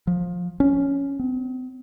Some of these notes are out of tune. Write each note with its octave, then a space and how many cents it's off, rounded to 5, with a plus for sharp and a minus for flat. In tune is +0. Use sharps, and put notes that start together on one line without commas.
F3 +20
C#4 +5
C4 -45